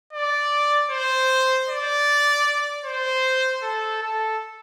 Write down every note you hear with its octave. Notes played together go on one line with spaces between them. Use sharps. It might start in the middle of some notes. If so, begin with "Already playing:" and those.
D5
C5
D5
C5
A4
A4